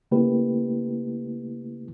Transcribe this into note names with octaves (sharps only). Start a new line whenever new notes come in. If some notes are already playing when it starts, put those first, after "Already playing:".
C#3 A3 A#3 E4 G4 B4